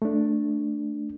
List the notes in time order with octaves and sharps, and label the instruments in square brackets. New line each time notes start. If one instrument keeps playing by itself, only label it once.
[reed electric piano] A3 D4